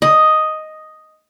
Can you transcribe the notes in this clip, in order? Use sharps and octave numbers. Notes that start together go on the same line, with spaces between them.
D#5